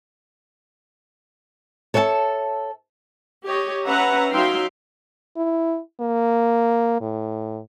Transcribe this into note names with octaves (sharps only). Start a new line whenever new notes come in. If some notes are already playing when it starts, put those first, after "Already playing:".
A4 C#5 E5 F5 A5
G4 C#5 D#5
C#4 B4 E5 F#5 A#5
F#3 D#4 E5 F5 G5 C6
E4
A#3
A2